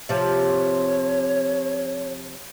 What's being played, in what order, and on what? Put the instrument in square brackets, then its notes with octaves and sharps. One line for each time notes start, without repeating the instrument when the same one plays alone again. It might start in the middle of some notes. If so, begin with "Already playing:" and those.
[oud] C3 F3 [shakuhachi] C#5